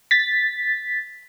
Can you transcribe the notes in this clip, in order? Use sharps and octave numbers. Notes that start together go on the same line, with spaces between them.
A6 B6